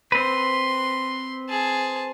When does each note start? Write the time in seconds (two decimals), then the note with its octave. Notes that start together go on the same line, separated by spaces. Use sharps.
0.12 C4 B4 C6
1.49 G#4 A5